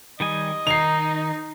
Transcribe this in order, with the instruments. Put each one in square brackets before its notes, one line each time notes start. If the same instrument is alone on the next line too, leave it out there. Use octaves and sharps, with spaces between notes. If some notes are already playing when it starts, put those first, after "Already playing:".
[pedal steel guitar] D#3 G3 G#5 [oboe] D#5
[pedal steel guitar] D#3 [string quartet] D#4 [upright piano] C7 F7